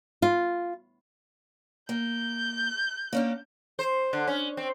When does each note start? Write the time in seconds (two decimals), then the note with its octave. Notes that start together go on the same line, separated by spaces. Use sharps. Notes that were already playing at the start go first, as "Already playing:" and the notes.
0.22 F4
1.89 A#3 G6
3.13 A#3 C#4 D4
3.79 C5
4.13 D3
4.27 C#4
4.57 C4